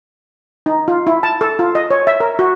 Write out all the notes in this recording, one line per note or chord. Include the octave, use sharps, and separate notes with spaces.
D#4
F4
E4
A5
A4
F4
D#5
C#5
E5
A#4
F#4